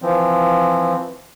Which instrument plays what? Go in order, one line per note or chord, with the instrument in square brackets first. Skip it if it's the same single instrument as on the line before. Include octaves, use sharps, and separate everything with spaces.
[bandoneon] E3 F3 C4